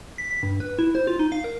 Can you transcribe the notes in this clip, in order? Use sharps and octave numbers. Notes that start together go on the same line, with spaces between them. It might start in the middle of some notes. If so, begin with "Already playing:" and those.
B6
B6
G2
B4
E4
C5
F4
D#4
F5
A#4